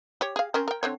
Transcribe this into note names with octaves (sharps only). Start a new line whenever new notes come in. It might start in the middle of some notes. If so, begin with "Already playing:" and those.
G4 C#5
G#4 F5
C4 C#4 A#4
A#4 G5
D3 C4 C#5